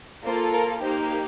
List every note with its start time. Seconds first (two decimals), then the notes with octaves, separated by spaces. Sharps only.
0.24 A#3 F4 A4 C5
0.52 A#4
0.80 A#3 D#4 G4 C5